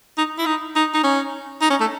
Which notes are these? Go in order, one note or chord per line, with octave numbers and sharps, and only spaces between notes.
D#4
E4
D#4
D#4
D#4
C#4
D#4
C#4
A3